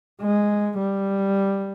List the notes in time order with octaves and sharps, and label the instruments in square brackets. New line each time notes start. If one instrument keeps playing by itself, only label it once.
[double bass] G#3
G3